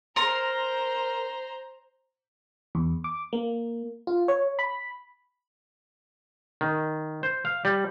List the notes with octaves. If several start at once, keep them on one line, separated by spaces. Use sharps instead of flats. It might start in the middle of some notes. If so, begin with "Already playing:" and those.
A#4 C5 A#5 C6
E2
D6
A#3
F4
C#5
B5
D#3
C5
F5
G3